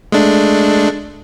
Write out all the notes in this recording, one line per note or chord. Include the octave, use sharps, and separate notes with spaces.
G#3 A3 D4